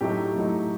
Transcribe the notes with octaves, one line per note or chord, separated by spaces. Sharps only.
A2 F#3 A3 D#4 G4
A2 F#3 A3 D#4